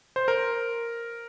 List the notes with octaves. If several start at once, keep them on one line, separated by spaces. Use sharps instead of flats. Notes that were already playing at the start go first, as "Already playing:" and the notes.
C5
A#4